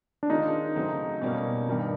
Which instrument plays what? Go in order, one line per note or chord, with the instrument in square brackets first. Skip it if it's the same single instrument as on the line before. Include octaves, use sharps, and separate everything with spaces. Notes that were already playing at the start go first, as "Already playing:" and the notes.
[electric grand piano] D4
[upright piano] D#3 G#3 C#4 F4 A#4 [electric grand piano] D#4
[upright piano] C#3 F#3 A3 C4
B2 G3 A#3 C#4
G2 D#3 G3 A#3